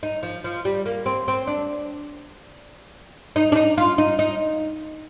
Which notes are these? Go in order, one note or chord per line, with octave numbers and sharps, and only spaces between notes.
D#4
F3
F3
G3
A#3
C4
C4
D4
D#4
D4
D#4
F4
D#4
D#4